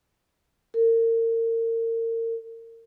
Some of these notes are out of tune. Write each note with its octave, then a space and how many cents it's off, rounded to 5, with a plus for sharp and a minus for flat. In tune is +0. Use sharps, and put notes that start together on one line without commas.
A#4 -35